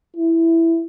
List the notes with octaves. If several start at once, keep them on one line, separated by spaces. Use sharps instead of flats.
E4